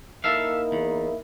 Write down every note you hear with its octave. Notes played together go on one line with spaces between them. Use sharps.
A#3 D#4 E4 A4 E5 F5
E2